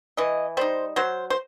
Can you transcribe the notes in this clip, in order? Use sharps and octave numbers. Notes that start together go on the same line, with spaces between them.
E3 D#5
G3 D#4 C5
F#3 C5
C5